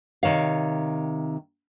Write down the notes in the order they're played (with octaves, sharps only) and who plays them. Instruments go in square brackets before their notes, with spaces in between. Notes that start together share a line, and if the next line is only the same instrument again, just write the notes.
[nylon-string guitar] C3 D#3 C#5 F5